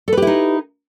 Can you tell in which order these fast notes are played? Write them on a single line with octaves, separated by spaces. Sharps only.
A4 B4 G4 E4 D#4